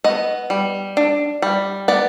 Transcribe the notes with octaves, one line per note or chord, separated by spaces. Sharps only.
B3 D#5
G3
D4
G3
B3 D5